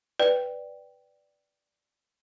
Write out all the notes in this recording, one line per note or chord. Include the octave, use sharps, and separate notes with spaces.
B4 D5 G5